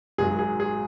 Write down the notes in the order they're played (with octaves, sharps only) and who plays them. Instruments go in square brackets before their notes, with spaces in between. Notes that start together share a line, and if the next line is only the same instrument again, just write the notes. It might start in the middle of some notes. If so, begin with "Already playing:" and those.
[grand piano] G#1 G#2 F#3 G#4
G#4
G#4